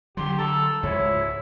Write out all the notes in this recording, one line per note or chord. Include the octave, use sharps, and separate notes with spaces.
D3 F#3 G4 C6
A4 A#5
C#2 G#2 G#3 E4 C#5